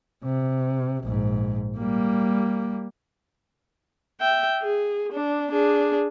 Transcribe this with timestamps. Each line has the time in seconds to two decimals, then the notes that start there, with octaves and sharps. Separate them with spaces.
0.24 C3
1.03 A#1 G#2
1.78 G3 A#3
4.20 E5 G5
4.62 G#4
5.13 D4
5.51 D4 G#4